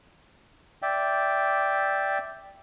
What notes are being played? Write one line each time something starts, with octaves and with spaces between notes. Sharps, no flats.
D5 E5 G5